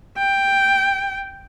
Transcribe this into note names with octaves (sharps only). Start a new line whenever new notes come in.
G5